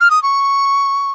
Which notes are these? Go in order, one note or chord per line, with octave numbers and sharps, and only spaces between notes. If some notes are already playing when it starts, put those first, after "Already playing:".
F6
D#6
C#6